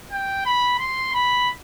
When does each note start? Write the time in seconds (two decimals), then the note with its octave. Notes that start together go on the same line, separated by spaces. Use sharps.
0.12 G5
0.46 B5
0.79 C6
1.14 B5